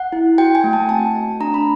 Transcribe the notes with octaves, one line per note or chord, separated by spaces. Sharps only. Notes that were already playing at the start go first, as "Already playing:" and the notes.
Already playing: F#5
E4
F#4 G5
G#5
A3
A5
C4 A5
A3
D4 A#5
B5